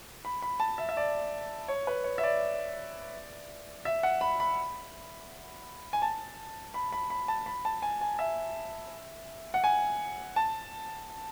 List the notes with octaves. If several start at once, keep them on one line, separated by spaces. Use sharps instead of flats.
B5
B5
A5
E5
E5
D5
C#5
B4
C#5
E5
D5
E5
F#5
B5
B5
G#5
A5
B5
B5
B5
A5
B5
A5
G#5
G#5
E5
F#5
G#5
A5